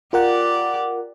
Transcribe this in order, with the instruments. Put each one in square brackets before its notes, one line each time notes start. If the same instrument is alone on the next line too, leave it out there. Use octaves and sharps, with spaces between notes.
[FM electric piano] F4 A#4 F#5 [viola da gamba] G4 D5